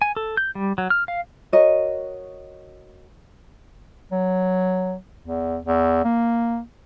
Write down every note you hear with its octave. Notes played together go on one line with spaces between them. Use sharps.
G#5
A4
G6
G3
F#3
F6
F5
F#4 A#4 C#5 D#5
F#3
E2
E2
A#3